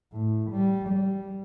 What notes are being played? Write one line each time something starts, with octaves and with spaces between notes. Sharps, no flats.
A2
G3
G3